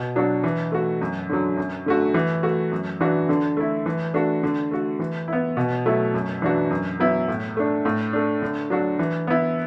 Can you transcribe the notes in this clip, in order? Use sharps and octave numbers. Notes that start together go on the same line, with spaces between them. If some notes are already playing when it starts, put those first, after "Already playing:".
Already playing: B2
F#3 D4 F#4
E3
A3 F#4
F#2
D3 F#3
F#2
D3 A3 F#4
E3
A3 F#4
F#2
E3 D4 F#4
D3
A3 E4
E3
A3 D4 F#4
D3
A3 F#4
E3
B3 E4
B2
F#3 A3 E4
F#2
E3 D4 F#4
F#2
F#3 B3 E4
A2
A3 D4
A2
A3 D4
D3
F#3 D4 F#4
E3
B3 E4